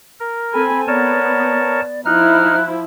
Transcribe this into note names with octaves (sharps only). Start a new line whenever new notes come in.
A#4
C4 A4 G#5 B5
B3 A#4 C#5 D5 A5
F3 D#4 E4 F6 F#6